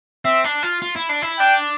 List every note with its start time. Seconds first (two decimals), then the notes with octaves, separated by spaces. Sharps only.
0.25 C4 E5
0.44 D4
0.63 F4
0.82 F4
0.96 E4
1.09 D4
1.22 E4
1.39 D4 G5